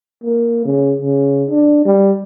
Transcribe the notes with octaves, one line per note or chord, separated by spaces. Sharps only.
A#3
C#3
C#3
D4
G3